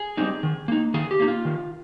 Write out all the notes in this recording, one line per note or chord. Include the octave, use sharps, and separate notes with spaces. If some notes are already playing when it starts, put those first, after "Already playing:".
Already playing: G#4
G3 C4 D#4
D#3
A#3 D#4
D#3 G#4
G4
A#3 D#4
F4
D#3